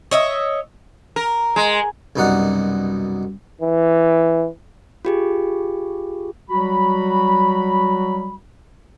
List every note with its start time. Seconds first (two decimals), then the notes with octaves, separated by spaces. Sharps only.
0.11 C#5 D#5 E5
1.16 A#4
1.56 G#3
2.16 C2 F#2 B2 D#4 D5 F#5
3.61 E3
5.05 F4 G4 G#4
6.50 F#3 G3 F#4 B5